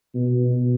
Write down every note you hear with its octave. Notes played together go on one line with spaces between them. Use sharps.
B2
B2